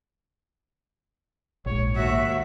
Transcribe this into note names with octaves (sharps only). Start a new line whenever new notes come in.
A#1 G#2 C#5
D#2 F#4 E5